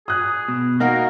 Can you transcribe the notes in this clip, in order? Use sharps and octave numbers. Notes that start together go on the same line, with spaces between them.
G#4 D#6 F#6
B2
A#3 D#4 F#4 A#4